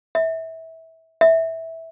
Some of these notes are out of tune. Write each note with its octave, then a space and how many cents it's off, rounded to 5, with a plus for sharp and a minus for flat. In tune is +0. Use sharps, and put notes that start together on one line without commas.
E5 -25
E5 -15